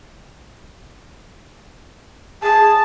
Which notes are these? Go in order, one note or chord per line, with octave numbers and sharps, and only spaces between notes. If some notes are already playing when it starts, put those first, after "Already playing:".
G#4 A5